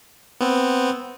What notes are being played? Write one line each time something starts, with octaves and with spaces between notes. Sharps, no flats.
B3 C4